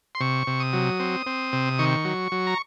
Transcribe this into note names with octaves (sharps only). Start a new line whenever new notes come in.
C6
C3 C#6
C3
D#6
F#3
C4
C4
C3
D#3 C#6
F#3
F#3
A#5